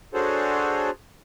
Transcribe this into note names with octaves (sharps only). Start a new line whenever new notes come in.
D4 F#4 G#4 A4 C5 C#5